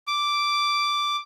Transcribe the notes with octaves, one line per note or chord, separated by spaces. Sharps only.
D6